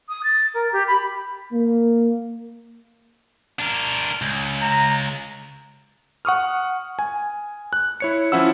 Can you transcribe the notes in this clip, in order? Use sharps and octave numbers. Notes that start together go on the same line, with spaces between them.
D#6
A6
A#4
G4
B5
A#3
D4 A#4
C#2
A#5
F#5 C#6 D#6 F6
G#5
F#6
E4 C#5 C#7
F3 C#4 E4 F#5 E6